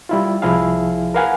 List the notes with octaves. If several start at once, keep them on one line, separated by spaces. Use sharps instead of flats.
G3 E4 F4
C2 F3 E4 G#4 F5
A#4 B4 F5 F#5 G#5